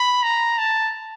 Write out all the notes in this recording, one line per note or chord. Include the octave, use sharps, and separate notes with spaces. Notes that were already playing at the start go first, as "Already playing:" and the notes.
Already playing: B5
A#5
A5